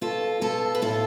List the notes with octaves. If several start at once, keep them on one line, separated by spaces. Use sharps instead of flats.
B2 F4 A4
B2 F4 A4
B4
A2 F4 A4